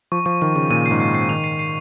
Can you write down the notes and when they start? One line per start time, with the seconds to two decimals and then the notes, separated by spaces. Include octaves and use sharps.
0.12 F3 C#6
0.26 F3 C#6
0.42 D#3 C#6
0.56 C#3 C#6
0.70 A#2 D#7
0.86 C7
0.91 G#2
1.00 C7
1.15 C7
1.29 D#3 F7
1.44 C7
1.59 C7